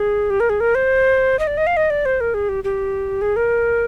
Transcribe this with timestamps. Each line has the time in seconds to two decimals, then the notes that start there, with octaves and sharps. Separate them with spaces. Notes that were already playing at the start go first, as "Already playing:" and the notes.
Already playing: G#4
0.30 G4
0.40 A#4
0.49 G#4
0.60 A#4
0.75 C5
1.39 D#5
1.47 D5
1.57 D#5
1.67 F5
1.77 D#5
1.90 D5
2.05 C5
2.21 A#4
2.34 G#4
2.49 G4
2.64 G4
3.21 G#4
3.36 A#4